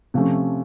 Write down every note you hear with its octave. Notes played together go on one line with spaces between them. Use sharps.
C3 F3 A3 C#4